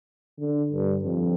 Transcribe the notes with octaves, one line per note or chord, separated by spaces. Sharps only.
D3
G2
F2